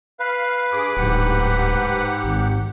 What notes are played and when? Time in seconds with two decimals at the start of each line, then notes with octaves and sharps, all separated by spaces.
0.20 B4 F5
0.72 G2 G#4 D6
0.97 D1 G#2 G4 F#5
2.24 G#1